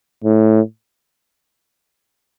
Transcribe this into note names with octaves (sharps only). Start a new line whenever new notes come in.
A2